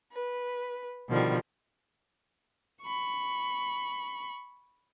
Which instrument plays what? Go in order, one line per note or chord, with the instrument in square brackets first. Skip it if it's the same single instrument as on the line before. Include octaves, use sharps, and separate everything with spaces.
[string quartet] B4
B2 D3 D#3 F3 G3
[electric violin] B5 C#6